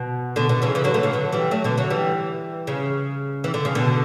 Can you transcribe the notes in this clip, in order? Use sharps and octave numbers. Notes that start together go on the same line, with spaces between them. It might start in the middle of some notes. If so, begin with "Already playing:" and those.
Already playing: B2
B2 D3
B2 D3
C#3 E3
C#3 E3
D3 F#3
F#3 A3
C#3 E3
D3 F#3
E3 G3
F#3 A3
B2 D3
D3 F#3
E3 G3
C#3
E3
D3
C#3
B2 D3